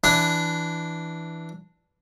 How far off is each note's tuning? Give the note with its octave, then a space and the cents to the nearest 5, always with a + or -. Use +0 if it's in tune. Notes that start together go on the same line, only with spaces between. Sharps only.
E3 +0 D4 +0